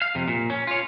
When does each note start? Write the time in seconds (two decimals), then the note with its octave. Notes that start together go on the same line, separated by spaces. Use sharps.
0.02 F5
0.15 F2 C3
0.28 A#2
0.50 C#4
0.67 F4 C#5